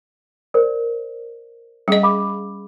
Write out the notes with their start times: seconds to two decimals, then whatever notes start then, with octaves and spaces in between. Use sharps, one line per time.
0.54 A#4 C5 D5
1.88 G3 C#4 G#4 D#5
2.03 F5 B5 D6